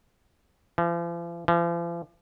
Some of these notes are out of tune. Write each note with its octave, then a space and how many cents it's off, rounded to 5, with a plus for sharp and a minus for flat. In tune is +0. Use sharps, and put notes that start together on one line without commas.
F3 -45
F3 -45